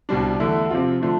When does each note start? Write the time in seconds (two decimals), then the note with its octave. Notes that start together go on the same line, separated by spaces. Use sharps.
0.09 C2 B2 G3 D4
0.40 E2 D3 A3 E4
0.71 C3 F3 C4 F4
1.02 D3 F3 A3 D4